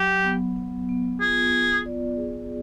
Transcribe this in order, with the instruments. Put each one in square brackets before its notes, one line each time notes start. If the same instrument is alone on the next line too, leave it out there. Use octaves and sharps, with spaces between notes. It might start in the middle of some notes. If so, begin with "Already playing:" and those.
Already playing: [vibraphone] F#3 [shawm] G4
[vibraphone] B3
B3
B3
[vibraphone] F4 [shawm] G#4
[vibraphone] F4
D5
G#4